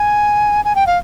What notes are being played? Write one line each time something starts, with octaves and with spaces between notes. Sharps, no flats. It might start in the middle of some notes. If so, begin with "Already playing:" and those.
Already playing: G#5
G#5
G5
F5